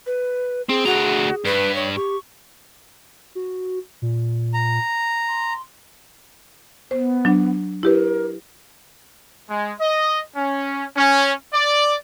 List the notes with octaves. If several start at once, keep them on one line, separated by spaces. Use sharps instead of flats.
B4
C4 G#4
D2 F#4 A#5
G2 B4
C#5
G4 C#6
F#4
A#2
A#5
C6
B3 C5
F#3 D4
E4 G4 A#4 B4
G#3
D#5
C#4
C#4
D5